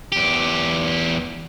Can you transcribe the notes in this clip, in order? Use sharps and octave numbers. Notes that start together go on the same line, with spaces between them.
E2 G4